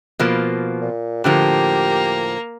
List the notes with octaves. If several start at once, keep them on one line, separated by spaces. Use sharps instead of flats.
B2 F3 A#3
A#2
A2 D3 F3 A#3 G4